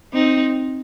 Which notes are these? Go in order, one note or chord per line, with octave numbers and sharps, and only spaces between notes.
C4 D#4